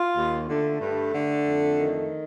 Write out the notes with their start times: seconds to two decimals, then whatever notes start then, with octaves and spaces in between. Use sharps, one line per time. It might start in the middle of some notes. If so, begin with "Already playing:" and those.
Already playing: F4
0.16 D#2
0.49 D3 A3
0.80 G2
1.13 D3
1.45 F2
1.78 D#3